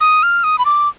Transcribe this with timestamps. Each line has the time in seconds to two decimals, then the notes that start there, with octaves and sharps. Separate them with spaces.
0.01 D#6
0.23 F6
0.44 D#6
0.59 B5
0.65 D6